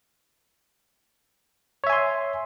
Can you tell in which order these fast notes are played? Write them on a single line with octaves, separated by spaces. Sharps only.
C#5 E5 G#5 C6